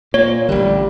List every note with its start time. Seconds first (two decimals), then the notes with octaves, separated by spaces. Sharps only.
0.14 A#2 A#3 C#5
0.49 A1 D3 G3